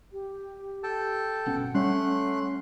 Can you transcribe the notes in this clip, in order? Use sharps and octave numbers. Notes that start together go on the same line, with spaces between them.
G4
A4 G5 A5
G1 B2 C#4 F#5
G3 A3 C#4 C6 F#6